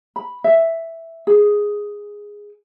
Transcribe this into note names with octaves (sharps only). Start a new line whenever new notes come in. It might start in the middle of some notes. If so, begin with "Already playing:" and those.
B5
E5
G#4